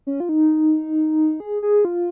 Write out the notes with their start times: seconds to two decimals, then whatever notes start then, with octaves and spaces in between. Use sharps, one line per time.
0.07 C#4
0.20 F4
0.29 D#4
1.40 G#4
1.63 G#4
1.85 F4